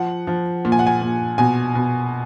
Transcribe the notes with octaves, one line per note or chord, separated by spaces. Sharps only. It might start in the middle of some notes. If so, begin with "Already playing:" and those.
Already playing: F3 F#5
F3
A#2
G#5
F#5
G#5
A#2
B2 G#5
B2